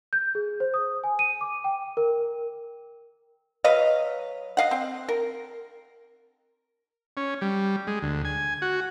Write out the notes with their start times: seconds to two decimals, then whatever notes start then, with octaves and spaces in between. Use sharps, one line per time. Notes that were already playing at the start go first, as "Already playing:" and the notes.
0.13 G6
0.35 G#4
0.60 C5
0.74 D#6
1.04 G#5
1.19 D#7
1.41 D6
1.64 G5
1.97 A#4
3.64 F#3 B4 D#5 F5
4.57 D#5 F5 F#5
4.71 C4
5.09 A#4
7.17 C#4
7.41 G3
7.87 G#3
8.02 D2
8.25 G#5
8.62 F#4